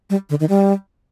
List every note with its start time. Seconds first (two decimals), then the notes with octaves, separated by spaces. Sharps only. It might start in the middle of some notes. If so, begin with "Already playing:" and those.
0.10 G3
0.30 D3
0.40 D#3
0.49 G3